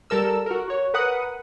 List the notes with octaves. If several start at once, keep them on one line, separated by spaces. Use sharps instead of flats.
G3 A4 A#4 E6
F#4 A#4
F#4 C#5
A#4 B4 F#5 D#6